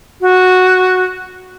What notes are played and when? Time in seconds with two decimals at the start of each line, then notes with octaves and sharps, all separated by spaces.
0.21 F#4